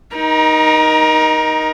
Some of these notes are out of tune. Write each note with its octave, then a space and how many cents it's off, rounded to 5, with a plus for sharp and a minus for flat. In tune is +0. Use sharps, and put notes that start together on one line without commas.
D#4 +0 A#4 +30